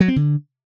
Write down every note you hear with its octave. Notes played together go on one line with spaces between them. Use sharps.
F#3
C4
D3